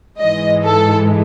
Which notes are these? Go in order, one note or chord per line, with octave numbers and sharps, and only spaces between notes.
G#2 E3 G#3 D#5
A4